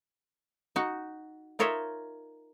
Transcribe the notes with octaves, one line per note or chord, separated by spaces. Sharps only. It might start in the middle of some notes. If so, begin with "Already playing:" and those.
D#4 F#4
D#4 F4 A#4 C#5 D#5 E5